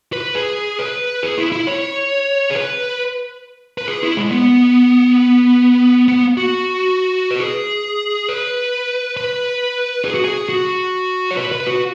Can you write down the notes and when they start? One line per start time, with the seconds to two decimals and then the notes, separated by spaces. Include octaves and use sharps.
0.13 B4
0.35 G#4
0.79 B4
1.23 G#4
1.38 E4
1.52 E4
1.67 C#5
2.51 G#4
2.55 B4
3.78 B4
3.87 G#4
4.02 E4
4.17 G#3
4.31 B3
6.08 B3
6.37 F#4
7.31 B4
7.40 G#4
8.28 B4
9.17 B4
10.05 G#4
10.14 F#4
10.25 G#4
10.49 F#4
11.31 C#5
11.37 B4
11.52 B4
11.67 F#4